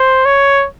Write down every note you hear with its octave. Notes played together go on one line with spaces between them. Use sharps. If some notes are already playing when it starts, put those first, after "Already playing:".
Already playing: C5
C#5